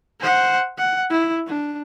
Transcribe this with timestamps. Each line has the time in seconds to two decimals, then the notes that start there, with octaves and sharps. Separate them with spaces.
0.21 C5 F#5
0.78 F#5
1.10 E4
1.47 D4